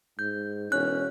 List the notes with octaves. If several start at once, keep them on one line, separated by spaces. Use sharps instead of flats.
G#2 G6
E1 C#4 F#6